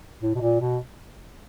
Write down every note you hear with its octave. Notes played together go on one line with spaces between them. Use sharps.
A2
B2
A#2
B2